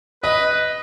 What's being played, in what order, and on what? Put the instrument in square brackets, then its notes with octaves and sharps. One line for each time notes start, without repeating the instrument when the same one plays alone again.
[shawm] B4 [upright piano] D#5